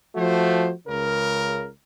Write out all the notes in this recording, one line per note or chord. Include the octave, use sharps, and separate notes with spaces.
F3 A3 F#4 C5
C#2 C#3 A#4